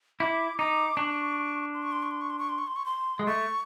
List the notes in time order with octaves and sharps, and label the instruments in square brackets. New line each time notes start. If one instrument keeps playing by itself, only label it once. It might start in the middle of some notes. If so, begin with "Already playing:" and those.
[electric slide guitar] E4 [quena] D6
[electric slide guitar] D#4 [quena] D6
[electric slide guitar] D4 [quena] C#6
[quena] C6
C#6
C6
C#6
C6
C#6
C6
C#6
C6
C#6
C6
C#6
C6
[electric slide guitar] G#3
[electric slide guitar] A3 [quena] C#6